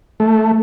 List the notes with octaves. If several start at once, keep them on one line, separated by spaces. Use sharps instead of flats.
A3